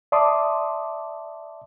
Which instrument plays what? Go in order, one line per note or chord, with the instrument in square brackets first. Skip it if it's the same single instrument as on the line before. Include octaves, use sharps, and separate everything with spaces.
[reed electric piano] D5 E5 A5 C6 D6 D#6